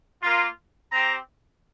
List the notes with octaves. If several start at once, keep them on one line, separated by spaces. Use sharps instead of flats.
A#3 F4
C4 G4 A#5